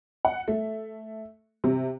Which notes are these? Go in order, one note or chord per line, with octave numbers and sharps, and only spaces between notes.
F#5
A3
C3